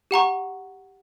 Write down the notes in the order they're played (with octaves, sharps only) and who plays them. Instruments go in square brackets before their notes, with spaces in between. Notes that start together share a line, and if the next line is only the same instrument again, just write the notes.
[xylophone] G4 F#5 A#5 C#6